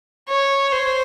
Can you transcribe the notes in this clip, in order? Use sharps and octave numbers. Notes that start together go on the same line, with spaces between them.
C#5
C5